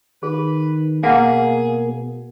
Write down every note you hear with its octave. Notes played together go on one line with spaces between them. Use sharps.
D#3 G#4 B4
B2 A#3 G#4 F5 F#5